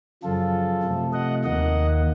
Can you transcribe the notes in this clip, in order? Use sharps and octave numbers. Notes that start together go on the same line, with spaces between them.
F#2 C#3 F3 F4 A4
C3 F3 A3
D#5 F#5
D#2 D#3 A#3 D#5 F#5